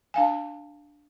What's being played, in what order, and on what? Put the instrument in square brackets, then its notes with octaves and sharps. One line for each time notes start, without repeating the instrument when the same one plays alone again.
[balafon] D4 F5 G#5